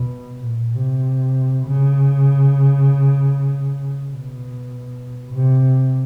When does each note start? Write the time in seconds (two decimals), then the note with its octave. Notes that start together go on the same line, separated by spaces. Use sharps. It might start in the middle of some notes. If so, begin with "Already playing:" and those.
Already playing: B2
0.44 A#2
0.75 C3
1.66 C#3
4.10 B2
5.32 C3